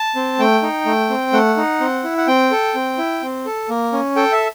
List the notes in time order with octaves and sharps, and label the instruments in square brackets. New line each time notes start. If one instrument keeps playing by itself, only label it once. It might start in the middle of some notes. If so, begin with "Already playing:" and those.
Already playing: [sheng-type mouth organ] A5
C4
A3 G5
D#4
A3
C4
A3 F#5
D#4
C4
E4
F#5
C4 G5
A4
C4
E4
C4
A4
A#3
C#4
A4 G5
E5